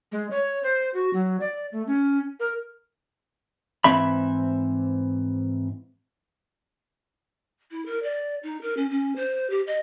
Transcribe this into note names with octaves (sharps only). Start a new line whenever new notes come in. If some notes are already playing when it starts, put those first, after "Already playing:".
G#3
C#5
C5
F#4
F#3
D5
A3
C#4
A#4
G#2 E3 C4 E5 B5
E4
A#4
D5
D#4
A#4
C#4
C#4
C5
G4
D#5